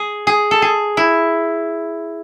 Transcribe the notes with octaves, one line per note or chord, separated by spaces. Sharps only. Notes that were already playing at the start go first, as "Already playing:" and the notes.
Already playing: G#4
G#4
A4
G#4
E4